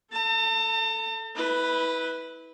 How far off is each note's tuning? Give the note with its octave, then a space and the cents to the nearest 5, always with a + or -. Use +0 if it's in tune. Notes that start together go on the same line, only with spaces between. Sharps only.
A4 +0 A5 +45
E4 -30 B4 +0